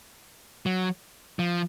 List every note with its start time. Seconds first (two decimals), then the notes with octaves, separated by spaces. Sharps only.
0.66 F#3
1.39 F3